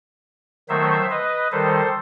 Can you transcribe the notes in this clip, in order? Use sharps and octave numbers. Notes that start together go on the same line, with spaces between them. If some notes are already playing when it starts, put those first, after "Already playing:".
D#3 F#3 A3 C5 E5
B4 D#5
D#3 G3 A4 C5